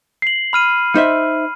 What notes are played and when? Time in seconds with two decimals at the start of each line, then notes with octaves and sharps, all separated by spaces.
0.22 C7 F#7
0.53 B5 F6 D#7
0.95 D#4 C5 E5